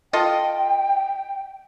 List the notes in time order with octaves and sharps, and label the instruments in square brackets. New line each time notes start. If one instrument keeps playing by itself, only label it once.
[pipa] F4 A4 D#5 [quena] G5